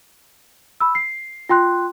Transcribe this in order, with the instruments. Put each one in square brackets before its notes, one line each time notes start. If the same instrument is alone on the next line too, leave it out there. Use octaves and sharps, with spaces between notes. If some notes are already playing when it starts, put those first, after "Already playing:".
[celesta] B5 E6
C7
F4 G5 C6 F#6